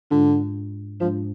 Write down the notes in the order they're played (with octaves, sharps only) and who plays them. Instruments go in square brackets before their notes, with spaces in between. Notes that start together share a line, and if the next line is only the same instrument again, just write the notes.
[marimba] G#2 G#3 D4 F4 [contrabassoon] D3
[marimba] G#2 G#3 D4 F4 [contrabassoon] F3